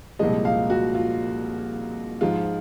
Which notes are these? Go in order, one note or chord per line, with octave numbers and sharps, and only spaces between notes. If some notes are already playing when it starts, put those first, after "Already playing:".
C2 A#2 F3 G#3 D#5
F5
F#4
F4
G#2 F3 G#3 F4